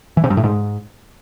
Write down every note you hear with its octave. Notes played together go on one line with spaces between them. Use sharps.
E3
C3
G2
A2
G#2